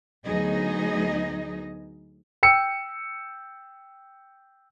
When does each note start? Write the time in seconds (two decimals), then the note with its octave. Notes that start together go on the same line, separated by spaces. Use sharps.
0.24 D2 F#3 B3 D#4 G#4 D#5
2.43 G5 E6 C#7